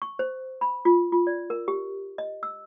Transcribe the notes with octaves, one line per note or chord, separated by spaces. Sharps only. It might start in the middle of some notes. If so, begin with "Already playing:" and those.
C#6
C5
B5
F4
F4
D5
A#4
G4
D#5
E6